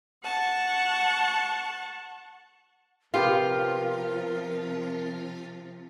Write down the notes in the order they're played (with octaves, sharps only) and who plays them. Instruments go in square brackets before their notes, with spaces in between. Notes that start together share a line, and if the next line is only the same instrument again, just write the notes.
[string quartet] F#5 A5 C#6
[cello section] C3 F3 [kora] B3 G4 F5 [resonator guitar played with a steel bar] F4 [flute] A#4